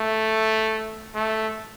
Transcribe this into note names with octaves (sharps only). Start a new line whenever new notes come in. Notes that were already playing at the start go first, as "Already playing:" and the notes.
Already playing: A3
A3